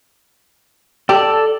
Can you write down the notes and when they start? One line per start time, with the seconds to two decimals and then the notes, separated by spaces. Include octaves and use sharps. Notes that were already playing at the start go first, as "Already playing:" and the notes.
1.09 G4 A4 D5